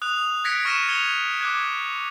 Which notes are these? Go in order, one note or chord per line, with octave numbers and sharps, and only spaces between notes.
D#6 F#6 F7
F#6 G#6 A#6 B6 C#7 D7
C#6 F6 A#6 C#7 D#7 E7
G#6 C#7 F7 G7
D6 F#6 G#6